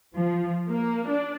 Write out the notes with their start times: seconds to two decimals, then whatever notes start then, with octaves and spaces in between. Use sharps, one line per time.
0.16 F3
0.68 A#3
1.07 D4